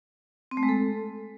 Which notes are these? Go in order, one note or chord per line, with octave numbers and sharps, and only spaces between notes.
C4
A3
G#3
A4